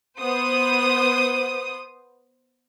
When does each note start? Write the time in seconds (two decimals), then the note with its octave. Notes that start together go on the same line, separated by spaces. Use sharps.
0.19 B3 C5 D#6